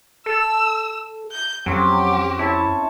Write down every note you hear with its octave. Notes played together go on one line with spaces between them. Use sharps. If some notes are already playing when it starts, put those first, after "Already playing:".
A4 E6
G6
F2 F#3 C4 C#4 G4
E4 C#5 A5 C#6